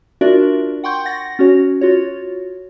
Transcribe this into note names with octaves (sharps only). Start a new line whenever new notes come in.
D4 F4 F#4 A#4 D5 E5
F#5 G5 C6 C#6 G6
F#5 A6 A#6
C#4 F#4 C#5
F4 F#4 C#5